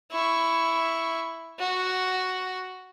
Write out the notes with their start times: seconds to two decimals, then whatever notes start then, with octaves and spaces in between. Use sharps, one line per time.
0.12 E4 C#6
1.59 F#4